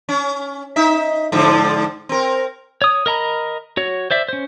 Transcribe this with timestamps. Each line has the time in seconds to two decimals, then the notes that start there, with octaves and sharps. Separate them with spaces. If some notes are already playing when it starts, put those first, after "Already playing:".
0.09 C#4
0.76 D#4 E5
1.32 G#2 D3 F3
2.09 C4 A#4
2.82 C#5 D#6
3.06 A#4 D#5 A#5 B5
3.77 F#4 C#5
4.11 C5 D5 E5
4.29 C#4 C5